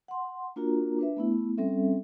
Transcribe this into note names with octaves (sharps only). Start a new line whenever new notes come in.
F#5 C6
A#3 D4 F4 F#4 A#4 A#5
D4 B4 E5
A3 B3 E4
G3 C4 C#4 A4 E5